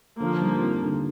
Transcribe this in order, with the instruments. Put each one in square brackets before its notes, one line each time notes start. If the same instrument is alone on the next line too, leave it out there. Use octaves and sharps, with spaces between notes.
[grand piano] D3 [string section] F3 A#3
[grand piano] G3
C4
D3